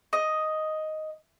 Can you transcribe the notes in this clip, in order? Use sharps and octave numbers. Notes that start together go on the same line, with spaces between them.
D#5